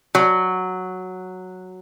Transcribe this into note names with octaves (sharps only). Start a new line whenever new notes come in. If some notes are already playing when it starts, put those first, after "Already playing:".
F#3